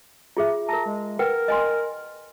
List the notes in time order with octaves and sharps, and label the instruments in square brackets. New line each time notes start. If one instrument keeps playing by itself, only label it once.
[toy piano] F4 G#4 E5
[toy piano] A#4 A5 [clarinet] A#5
[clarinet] G#3
[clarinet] A#4 [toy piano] B4 F#5 G5
[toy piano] D#5 G#5 C6